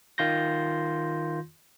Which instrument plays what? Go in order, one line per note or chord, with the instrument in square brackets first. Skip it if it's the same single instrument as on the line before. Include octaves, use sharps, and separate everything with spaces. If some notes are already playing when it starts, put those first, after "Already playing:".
[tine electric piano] D#3 F4 C6 G6 A#6